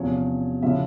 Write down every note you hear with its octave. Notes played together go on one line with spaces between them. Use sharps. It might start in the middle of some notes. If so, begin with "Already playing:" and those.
Already playing: E2 C3 F3 C#4 C#5
C#3 F3 E4 E5